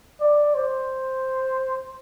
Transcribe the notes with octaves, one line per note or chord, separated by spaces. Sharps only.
D5
C5